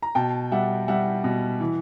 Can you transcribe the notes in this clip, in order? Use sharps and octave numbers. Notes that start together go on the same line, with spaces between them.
A#5
B2 G5 A5
G3 E5 F#5
G3 E5 F#5
B2
E3